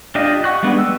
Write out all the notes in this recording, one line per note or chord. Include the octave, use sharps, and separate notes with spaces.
D4 F4 G4 D#5
F#5 C#6 F#6
G3 G#3 B3 D4
E6